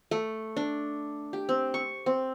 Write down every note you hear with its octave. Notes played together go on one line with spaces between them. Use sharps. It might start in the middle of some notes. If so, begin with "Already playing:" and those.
A3
D4
G4
C4
C#6
C4